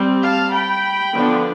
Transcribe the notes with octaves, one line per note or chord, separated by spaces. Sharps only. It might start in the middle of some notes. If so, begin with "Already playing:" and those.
Already playing: G3 C4
F5 A5
G5 B5
D3 F3 B3 D4